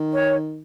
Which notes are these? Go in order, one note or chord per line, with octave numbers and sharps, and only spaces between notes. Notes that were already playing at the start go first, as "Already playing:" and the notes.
Already playing: D#3
C#5